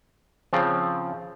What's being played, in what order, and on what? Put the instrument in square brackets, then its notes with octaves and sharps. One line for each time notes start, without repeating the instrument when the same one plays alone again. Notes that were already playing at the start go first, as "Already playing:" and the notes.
[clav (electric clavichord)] C#3 F3 C4